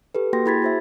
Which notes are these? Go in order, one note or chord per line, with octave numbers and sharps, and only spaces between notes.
G4 A4 B4
A#3 F#4 G5 C6 A#6
E4 G#4 B5 G#6 A6 B6
F#4 C5 E5